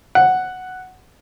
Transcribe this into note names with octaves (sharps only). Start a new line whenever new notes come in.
F#5